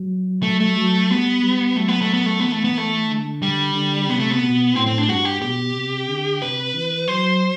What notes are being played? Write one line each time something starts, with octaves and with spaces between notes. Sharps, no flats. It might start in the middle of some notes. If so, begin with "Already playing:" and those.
Already playing: F#3
A3
A3
F#3
G3 B3
G3
F#3 A3
B3
A3
B3
A3
E3 B3
A3
B3
A3
D3
G3
D3
C3 B3
A3
B3
B2
A2 C4
C4
D4
G2 F#4
G4
B2 G4
C3
D3
C3 B4
E3
F#3 C5